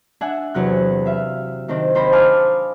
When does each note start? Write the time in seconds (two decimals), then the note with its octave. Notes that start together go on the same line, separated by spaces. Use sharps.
0.21 D4 E5 F#5 G#5
0.54 E2 C3 F#3 F#6
1.05 E5 F5
1.68 C3 D#3 C4 D4
1.95 D#2 C5 A#5 B5
2.12 F5 G#5 A5 D6 D#6 F6